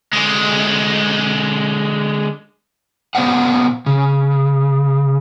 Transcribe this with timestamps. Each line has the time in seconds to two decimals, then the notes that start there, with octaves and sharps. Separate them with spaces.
0.13 D3 G#3
3.15 A#2 B3 C5 D5 F5 F#5
3.86 C#3